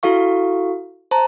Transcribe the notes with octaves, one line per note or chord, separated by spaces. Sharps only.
E4 F#4 A4 F5 C#6
C5 A5 A#5